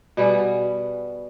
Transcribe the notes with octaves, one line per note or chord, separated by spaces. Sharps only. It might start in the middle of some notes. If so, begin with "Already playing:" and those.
B2 G3 B3 G#4